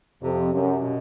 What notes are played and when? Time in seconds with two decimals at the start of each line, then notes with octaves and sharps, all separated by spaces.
0.22 F2 C3
0.52 F#2 C3
0.83 B2